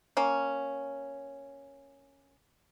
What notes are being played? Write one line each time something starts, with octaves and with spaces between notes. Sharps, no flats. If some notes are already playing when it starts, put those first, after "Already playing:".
A#3 C#4